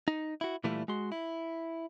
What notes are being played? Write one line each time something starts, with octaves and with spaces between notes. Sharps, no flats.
D#4
E4 F#4
A#2 E3 G3 A3 E4 F4
G#3 F#4 C6
E4